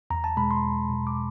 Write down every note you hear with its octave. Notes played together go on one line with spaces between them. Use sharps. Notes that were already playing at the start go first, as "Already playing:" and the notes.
E2 A#5
A5
B2 G#3 B5
C6
E2
B2 G#3
D6